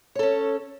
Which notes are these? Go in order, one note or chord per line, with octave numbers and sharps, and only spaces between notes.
C#4 A4 C#5